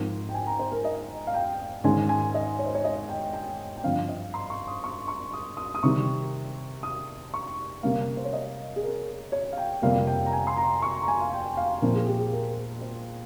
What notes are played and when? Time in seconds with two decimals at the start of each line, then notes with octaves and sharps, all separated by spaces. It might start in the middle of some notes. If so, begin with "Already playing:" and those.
Already playing: G#2 F3 C4 A#4
0.29 G5
0.34 G#5
0.47 A#5
0.59 C5
0.72 A#4
0.85 D#5
1.27 F5
1.34 G5
1.84 G#2 D#3 G#3 C#4 G#5
2.09 G#5
2.34 D#5
2.59 C#5
2.66 C5
2.75 C#5
2.84 D#5
3.09 G5
3.33 G5
3.76 G5
3.84 G2 F3 C4 F5
4.08 D#5
4.34 C6
4.50 C#6
4.68 D#6
4.84 C#6
5.08 C#6
5.33 D#6
5.57 D#6
5.75 D#6
5.83 C3 D#3 G3 C#6
6.83 D#6
7.34 C#6
7.83 C3 G3 A#3 C#4 F5
8.17 C5
8.25 C#5
8.33 D#5
8.76 G#4
8.83 A#4
9.32 C#5
9.52 F5
9.57 G5
9.82 F2 C3 G3 A#3 F5
10.07 G5
10.26 A#5
10.33 G#5
10.47 C6
10.57 A#5
10.82 C#6
11.02 A#5
11.08 G#5
11.21 F5
11.33 G5
11.57 F5
11.82 A#2 F3 C4 A#4
11.95 G#4
12.07 G4
12.20 G#4
12.32 A#4
12.81 C5